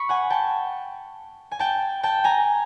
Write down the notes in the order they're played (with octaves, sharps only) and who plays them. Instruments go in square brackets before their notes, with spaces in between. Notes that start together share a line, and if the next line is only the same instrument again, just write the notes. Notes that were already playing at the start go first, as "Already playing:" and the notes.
Already playing: [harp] B5 C#6
F#5 G#5
G5 A5
G#5
G5 A5
G5 A5
G#5 A#5